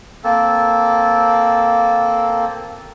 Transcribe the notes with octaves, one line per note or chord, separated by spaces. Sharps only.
A#3 C4 A4